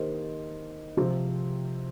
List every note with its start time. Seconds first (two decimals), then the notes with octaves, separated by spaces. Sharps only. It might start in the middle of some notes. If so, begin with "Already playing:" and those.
Already playing: D#3 A#3 G4 C5 D#5
0.97 C3 F3 C4